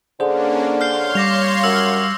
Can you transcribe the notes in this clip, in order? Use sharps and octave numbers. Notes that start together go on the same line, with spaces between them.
D3 A#3 C#4 D4 G#4 C5
C#5 F5 C6 F6 G6 C7
G3 D6 A#6 F7
F#2 E6